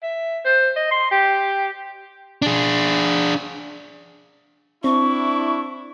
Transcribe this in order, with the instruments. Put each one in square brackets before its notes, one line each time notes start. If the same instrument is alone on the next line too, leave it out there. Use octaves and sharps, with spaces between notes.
[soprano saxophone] E5
C5
D#5
C6
G4
[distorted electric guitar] D4 G#4
[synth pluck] C4 [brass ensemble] D4 E4 [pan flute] C#6